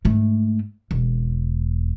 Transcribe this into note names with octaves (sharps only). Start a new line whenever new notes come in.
G#2 A3
E1